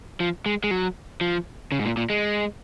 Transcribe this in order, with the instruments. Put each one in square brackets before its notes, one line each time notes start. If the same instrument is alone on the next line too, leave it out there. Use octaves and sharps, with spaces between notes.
[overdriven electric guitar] F3
G#3
G#3
F#3
F3
C#3
G#2
A#2
A#2
G#3